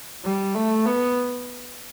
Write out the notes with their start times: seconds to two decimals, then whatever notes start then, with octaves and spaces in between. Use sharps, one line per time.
0.24 G3
0.55 A3
0.86 B3